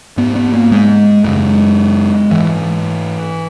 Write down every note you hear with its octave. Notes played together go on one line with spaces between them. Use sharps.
G#2 B3
B3
A#3
G#3
F#2 C#3 G#3
G#2 E3